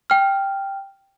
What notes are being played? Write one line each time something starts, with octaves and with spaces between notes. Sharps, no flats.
G5 F6